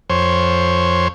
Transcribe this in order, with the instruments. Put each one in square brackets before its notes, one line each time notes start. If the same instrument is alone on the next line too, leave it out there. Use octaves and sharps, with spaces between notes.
[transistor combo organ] F2 C5 C#5